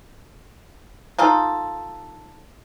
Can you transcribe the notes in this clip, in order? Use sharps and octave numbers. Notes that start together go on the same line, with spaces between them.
D#4 F4 A4